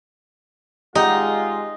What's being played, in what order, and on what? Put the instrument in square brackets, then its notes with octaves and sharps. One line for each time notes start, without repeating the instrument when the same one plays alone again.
[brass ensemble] G#3 F4 [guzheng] D#4 [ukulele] G4 F#5 A#5